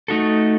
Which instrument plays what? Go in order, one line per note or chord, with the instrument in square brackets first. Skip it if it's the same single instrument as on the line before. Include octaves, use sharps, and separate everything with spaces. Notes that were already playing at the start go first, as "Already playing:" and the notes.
[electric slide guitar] A3 D#4 F#4 A4